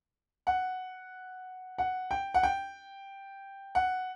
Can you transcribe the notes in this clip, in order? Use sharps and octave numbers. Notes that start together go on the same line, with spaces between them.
F#5
F#5
G5
F#5
G5
F#5